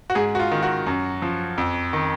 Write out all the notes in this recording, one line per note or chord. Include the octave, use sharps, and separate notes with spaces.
F#4
G#2 G#4
F#4
F4
D#3
F#4
F#2
F3
F2
D#3